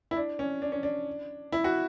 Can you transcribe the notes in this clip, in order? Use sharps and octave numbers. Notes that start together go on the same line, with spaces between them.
E4
D4
C#4
D4
C#4
D4
E4
F#4